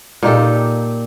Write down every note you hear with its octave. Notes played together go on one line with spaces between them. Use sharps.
A#2 D#4 G4 A4